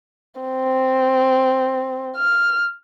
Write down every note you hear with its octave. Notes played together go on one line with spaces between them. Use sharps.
C4
F6